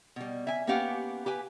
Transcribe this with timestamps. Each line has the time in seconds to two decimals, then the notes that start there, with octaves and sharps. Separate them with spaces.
0.16 B2 G3
0.47 E5 G#5
0.67 A#3 B3 C#4 G4 F5 F#5
1.26 G4 B4 G#5